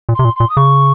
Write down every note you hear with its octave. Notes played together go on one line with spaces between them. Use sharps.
A#2
C3 C6
A#2
A#2 C6
D#6
C#3 C#6